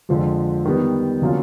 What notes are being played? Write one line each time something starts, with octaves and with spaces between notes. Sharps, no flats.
F2 D3 F3 G#3
D#3 G3 B3
D3 F#3 A#3 C#4 F4